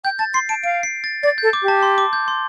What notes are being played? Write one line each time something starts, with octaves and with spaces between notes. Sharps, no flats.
G5 G6
A5 A6
C6 C7
A5 D7
F5 D7
C7
A6
D5 A6
A4 G6
D6
G4
A5
C6
D6
G6
C6